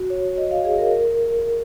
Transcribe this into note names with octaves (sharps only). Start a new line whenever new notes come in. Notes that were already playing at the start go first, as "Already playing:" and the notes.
Already playing: F#4
C#5
D#5
F5
G#4
A#4
A#4